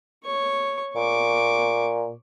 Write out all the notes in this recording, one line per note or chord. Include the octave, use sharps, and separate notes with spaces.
C#5 C#6
A#2 C#6 D6